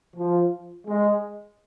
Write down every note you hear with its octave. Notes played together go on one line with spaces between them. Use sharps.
F3
G#3